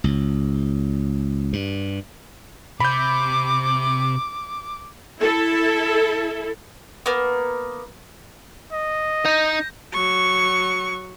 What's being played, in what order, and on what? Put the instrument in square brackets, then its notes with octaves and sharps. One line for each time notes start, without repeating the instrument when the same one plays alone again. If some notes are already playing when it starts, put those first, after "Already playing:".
[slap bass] C#2
G2
[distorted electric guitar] C3 [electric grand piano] B5 G6 [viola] D6
[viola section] E4 A4
[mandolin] A#3 B3
[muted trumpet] D#5
[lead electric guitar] D#4 [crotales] G6 A#6
[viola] F#3 C#6